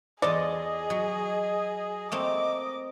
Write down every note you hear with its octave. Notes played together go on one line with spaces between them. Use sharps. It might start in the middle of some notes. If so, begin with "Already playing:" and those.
E2 F4 G#4 A4 D5 D#5
F#3
A3 A#3 C4 D6